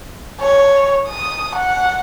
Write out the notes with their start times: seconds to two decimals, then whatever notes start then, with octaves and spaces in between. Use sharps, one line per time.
0.40 C#5
1.08 D#6
1.55 F#5